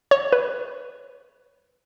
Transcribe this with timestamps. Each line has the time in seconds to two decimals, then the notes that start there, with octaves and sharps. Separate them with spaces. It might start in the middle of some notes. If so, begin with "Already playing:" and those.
0.11 C#5
0.32 B4